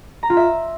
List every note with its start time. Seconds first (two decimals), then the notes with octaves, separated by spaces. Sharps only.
0.23 A#5
0.30 F4
0.37 E5